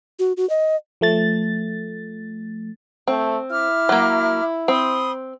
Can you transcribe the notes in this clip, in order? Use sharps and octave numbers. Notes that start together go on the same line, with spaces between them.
F#4
F#4
D#5
F3 A3 A6
A3 C4
E4 E5 D6 F6
F#3 A#3
C4 B5 C6 D#6